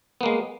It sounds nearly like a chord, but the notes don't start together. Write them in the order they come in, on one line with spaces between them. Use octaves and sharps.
B3 A#3 G#3